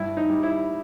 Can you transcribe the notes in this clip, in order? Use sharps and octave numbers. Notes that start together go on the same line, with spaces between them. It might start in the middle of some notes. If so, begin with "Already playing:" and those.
Already playing: G2 E4
D#4
G3
E4